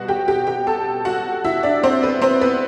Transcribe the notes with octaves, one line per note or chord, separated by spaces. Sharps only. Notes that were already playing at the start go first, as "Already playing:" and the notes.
Already playing: B2 G3 B3 F#4 F#5
G4 G5
G4 G5
G4 G5
A4 A5
F#4 F#5
E4 E5
D4 D5
C4 C5
B3 B4
C4 C5
B3 B4